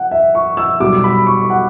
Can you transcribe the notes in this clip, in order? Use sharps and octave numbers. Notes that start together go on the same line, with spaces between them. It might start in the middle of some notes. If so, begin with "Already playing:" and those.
Already playing: F#5
E5
C#6
E6
B1 B2 G3 D6
B5
C#6
F#5